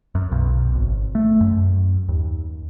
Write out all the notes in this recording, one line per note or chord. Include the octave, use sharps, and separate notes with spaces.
F#2
B1
G#1
A3
F#2
D#2